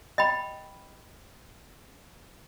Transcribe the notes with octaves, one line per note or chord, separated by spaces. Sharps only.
D#5 G5 B5